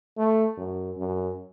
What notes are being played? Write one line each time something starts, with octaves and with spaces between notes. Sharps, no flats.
A3
F#2
F#2